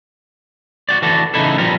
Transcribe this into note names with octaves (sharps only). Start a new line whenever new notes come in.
F#4 G4 D5
E3 F#4 A4 D5
C#3 E3 D#4 E4 A4
F3 G3 B3 A#4